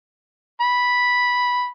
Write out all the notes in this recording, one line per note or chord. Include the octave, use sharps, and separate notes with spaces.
B5